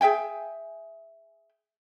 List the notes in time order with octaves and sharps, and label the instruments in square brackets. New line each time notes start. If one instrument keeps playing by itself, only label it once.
[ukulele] G#4 E5 G5 G#5